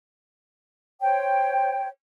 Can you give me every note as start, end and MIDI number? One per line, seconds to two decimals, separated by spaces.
1.02 1.88 72
1.02 1.88 73
1.02 1.88 79